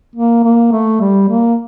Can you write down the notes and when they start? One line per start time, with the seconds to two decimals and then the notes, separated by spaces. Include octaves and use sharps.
0.16 A#3
0.44 A#3
0.72 A3
1.00 G3
1.29 A#3